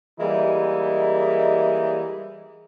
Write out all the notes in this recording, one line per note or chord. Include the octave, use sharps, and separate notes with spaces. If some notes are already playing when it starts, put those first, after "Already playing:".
E3 G3 G#3 A#3 D#4 E4